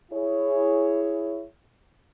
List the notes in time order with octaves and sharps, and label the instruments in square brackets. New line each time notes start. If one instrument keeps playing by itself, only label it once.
[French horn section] E4 G#4 C#5